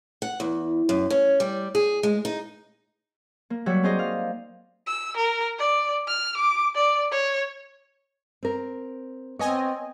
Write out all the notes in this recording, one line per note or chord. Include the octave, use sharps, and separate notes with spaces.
F#5
E2
F#2
C#4
G3
G#4
G#3
D#4
A#3
F#3 G3 F#4 C#5 E5
C4 D#4 G#4 C5 D5 D#5
F5
E6
A#4
D5
F6
D6
D5
C#5
C4 A#4
B3 C4 C#5 D#5 G#5